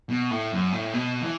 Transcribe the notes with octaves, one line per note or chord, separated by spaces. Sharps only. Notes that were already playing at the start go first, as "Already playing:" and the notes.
B2
A2
F#2
A2
B2
E3